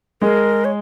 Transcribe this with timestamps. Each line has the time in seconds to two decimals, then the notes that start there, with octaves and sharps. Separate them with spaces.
0.22 G#3 G#4 A#4
0.65 C#5